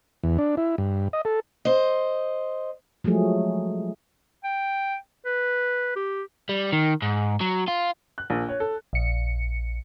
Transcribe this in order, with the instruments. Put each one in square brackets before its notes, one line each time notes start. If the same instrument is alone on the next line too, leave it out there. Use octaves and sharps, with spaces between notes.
[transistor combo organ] E2
D4
E4
G2
D#5
A4
[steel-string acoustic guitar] C5 D#5
[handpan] F3 F#3 G#3 A3 G#4
[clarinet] G5
B4
G4
[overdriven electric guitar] G3
D#3
G#2
F#3
F4
[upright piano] F#6
A#1
C#5
A4
[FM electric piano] A#1 C#7